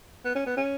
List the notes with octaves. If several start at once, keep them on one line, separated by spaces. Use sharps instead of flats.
B3
C#4
B3
C#4